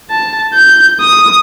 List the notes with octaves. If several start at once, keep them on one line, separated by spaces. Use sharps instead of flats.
A5
G6
D#6